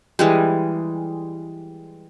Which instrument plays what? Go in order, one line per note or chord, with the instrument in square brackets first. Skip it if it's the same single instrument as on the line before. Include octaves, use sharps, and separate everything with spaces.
[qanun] E3 G3 G#3